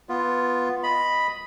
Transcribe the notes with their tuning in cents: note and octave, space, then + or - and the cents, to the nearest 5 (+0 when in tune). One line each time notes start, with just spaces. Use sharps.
B3 +0 F4 +0
D#5 +0 B5 +0